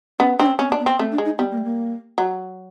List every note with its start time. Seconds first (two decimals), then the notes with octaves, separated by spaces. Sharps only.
0.19 B3 C#4
0.39 C4 D4
0.46 C#4
0.59 C4 C#4
0.69 B3
0.72 D4
0.80 B3
0.86 C4
0.99 A3 C4
1.11 D4
1.18 G#3
1.25 D#4
1.38 G3 B3
1.51 A#3
1.58 A3
1.65 A#3
2.18 F#3